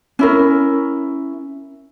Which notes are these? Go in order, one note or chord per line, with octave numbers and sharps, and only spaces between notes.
C#4 E4 A#4